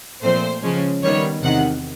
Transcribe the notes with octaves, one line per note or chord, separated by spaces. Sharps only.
A#2 F3 A3 C4 C5
C#3 F3 G#3 C#4
D#3 G3 B3 C#5
E2 C3 D#3 F#5